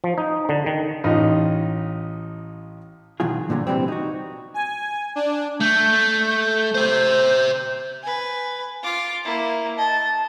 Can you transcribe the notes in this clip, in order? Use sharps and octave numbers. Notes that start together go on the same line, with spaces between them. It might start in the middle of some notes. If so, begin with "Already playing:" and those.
F3
D#4
D3
D#3
A1 D#4 F4
B2 D#3 E3 F#3 F4 G#4
G2 A#2 D3 F3 F#3
C3 E3 F3 G3 C4
D#4 F#4
G#5
D4
A3 G6
C5 E5
B4 G#5
F4 D6
A#3 E4
D#5 A5